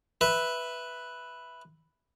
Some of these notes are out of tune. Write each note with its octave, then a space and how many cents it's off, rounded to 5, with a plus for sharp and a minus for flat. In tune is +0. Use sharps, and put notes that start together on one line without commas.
B4 +0 E5 +0